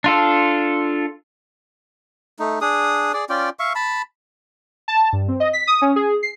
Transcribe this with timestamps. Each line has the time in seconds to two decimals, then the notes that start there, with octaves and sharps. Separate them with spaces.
0.04 D4 F4 A4
2.39 A3 D#4
2.61 D4 G#4 D#6
3.14 G#4 D5
3.29 C#4 F4 D5 G5
3.59 E5 F5 C#6
3.75 A5 B5
4.88 A5
5.13 G2
5.28 C4
5.40 D#5
5.53 B6
5.67 D#6
5.82 C#4
5.96 G#4
6.23 C7